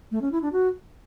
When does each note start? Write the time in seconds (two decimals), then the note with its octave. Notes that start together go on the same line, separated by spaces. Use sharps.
0.11 A3
0.22 C#4
0.32 E4
0.42 D4
0.52 F#4